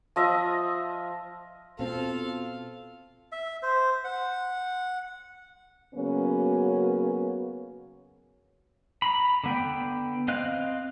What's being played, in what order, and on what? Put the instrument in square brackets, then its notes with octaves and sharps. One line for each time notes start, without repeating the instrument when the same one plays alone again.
[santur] F3 D#5 E5
[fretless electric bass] B2 C4 [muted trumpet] F4 [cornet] A4 [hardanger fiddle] F5
[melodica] E5
C5
F#5
[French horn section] C#3 F#3 A#3 B3 C#4 F#4
[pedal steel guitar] A#5 B5
D3 B3 G5
C4 D#5 F5 F#6